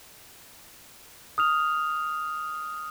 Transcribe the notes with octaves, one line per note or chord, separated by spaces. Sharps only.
D#6 F6 F7